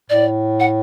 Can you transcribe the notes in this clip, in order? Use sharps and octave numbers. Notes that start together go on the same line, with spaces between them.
A2 D5
F#5